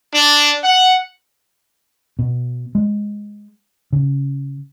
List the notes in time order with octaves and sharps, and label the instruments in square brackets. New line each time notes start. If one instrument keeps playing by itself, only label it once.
[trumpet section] D4
F#5
[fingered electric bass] B2
G#3
C#3